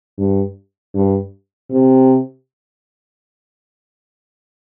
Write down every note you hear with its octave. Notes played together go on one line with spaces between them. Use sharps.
G2
G2
C3